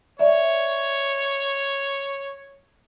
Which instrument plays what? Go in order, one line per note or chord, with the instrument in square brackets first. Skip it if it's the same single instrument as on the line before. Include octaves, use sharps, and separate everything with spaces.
[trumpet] C#5 [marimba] D5 E5